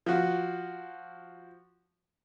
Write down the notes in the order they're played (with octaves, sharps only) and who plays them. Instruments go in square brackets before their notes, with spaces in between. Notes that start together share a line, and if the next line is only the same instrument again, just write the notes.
[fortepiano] F3 F#4